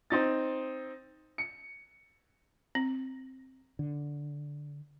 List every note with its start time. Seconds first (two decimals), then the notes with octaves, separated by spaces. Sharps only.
0.10 C4 D#4 A6
1.38 C#7
2.75 C4
3.79 D3